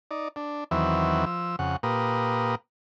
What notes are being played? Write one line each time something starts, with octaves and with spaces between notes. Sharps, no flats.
D#4 D5
D4
E2 D#3 E3 F#3 C4 E5
F3 E6
F2 C#3 F#5
A#2 A#3 G4 B4 A#5 D#6